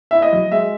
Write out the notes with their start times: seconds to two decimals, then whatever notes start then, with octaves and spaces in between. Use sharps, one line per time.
0.11 E4 E5
0.22 D#5
0.33 F#3
0.52 G#3 E5